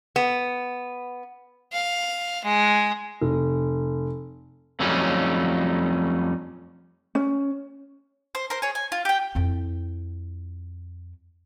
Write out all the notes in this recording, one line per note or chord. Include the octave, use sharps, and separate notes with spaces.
B3
F5
G#3
F1
F2 F#3 G3 A3 C#4 D#4
C#4
C5
A#4 C5
G#4 C#5
G#5
F4
G4 G5
F2 E4